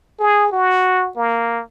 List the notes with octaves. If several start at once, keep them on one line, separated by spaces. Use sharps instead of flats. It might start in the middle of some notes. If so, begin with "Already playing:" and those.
G#4
F#4
A#3